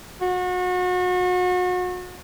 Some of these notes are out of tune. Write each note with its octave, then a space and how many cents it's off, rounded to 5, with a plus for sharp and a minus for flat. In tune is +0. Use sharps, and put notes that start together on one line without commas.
F#4 -35